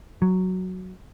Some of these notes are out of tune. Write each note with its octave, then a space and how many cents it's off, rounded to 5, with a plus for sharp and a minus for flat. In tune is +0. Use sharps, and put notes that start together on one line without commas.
F#3 +0